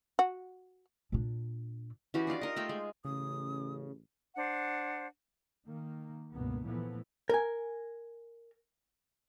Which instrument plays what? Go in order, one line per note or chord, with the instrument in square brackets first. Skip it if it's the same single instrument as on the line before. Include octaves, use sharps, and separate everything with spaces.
[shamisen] F#4
[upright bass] A#2 D4
[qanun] E3 C#4 F#4 G4
D4 D#4 F4 D5
A#4 D#5
A3 F4 G5
G#3
[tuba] A1 [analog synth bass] C#3 [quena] D#6
[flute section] D4 C5 F#5
[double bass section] D#3 A#3
C#2 G2 B2 A#3 B3
A#2 E3 F3 A3 B3
[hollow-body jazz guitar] A#4 G#5